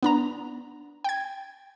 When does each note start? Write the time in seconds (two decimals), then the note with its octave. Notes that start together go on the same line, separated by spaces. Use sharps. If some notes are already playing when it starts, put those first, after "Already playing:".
0.03 B3 D4 A#5
1.04 G5 G#6